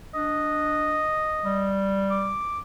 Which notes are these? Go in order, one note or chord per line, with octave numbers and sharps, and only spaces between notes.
D4 D#5
G3
D6